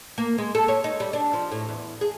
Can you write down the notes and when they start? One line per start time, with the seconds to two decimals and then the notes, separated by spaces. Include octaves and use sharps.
0.18 A#3
0.38 G#3
0.55 A4
0.68 C#5
0.84 D#4
1.00 G3
1.13 D4
1.33 F3
1.51 A2
1.69 E2
2.01 G#4